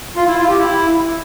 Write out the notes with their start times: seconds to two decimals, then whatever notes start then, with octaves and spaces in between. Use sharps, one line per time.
0.16 F4
0.27 E4
0.37 F4
0.48 G4
0.59 E4